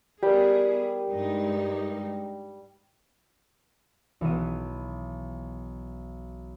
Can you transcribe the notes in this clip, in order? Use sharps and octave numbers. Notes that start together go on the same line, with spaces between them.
G3 B3 E4 G4 G#4 A#4
G2 G#3 D#4
B1 E3 B3 D#7